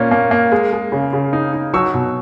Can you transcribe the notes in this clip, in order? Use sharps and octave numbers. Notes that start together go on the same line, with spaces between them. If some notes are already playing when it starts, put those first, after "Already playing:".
Already playing: A#2 A#3 C#4
A#3
A#3
G#3
G#3
C#3
C#3
D#4
D#4
F#3 C#6 E6
B2